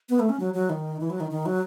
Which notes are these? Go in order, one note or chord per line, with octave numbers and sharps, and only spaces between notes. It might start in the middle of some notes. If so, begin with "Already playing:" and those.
B3
A3
C#4
F#3
F#3
D#3
E3
F#3
D#3
D#3
F#3